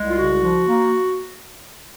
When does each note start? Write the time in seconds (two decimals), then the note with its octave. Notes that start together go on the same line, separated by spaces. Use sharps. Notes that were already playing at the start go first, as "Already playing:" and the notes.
Already playing: C2 G#3
0.09 F4
0.18 C#3 F#4
0.42 F3
0.66 A#3